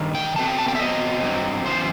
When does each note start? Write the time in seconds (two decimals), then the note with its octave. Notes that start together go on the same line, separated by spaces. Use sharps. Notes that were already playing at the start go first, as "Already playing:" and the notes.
Already playing: G2 D#3
0.15 G5
0.36 E2 B2 A3 C4 A5
0.47 G5
0.58 A5
0.68 G5
0.75 E5
0.79 B2 F#3 C4 D#5
1.23 G2 F#3 C4
1.65 F#2 E3 B3 C5